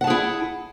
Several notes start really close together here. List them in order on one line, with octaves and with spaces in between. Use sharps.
F#5 A5 G#4 E4